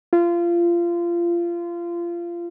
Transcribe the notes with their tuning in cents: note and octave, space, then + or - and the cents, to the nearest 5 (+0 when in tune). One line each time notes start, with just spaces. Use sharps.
F4 -25